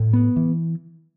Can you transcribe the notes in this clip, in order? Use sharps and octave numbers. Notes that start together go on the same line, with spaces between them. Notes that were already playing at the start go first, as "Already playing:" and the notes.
Already playing: A2
B3
E3